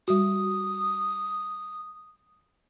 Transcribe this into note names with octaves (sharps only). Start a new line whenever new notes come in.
G3 F#4 D#6